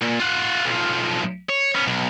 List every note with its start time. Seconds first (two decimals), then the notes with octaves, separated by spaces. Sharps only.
0.01 A#2
0.20 F4 F#5
0.65 B1 F3
1.49 C#5
1.75 B3 C#4
1.87 B1